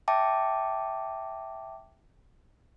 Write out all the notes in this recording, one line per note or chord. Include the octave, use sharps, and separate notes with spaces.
E5 G5 A5 D6